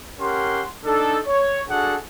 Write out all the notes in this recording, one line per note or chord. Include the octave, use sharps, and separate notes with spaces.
C#4 G4 A#4 F#5 C6
D4 D#4 A4
C#5
D4 F#4 G#4 A4 F#5